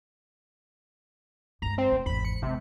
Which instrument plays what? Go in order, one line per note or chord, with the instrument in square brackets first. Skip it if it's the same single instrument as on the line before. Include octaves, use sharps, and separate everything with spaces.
[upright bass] G2 G#3 [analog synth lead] A#5
[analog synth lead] C4
[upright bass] E1 A3
[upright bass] G#1 E2 [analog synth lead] B5
[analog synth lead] C#7
[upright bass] D2 G#3 [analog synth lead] C3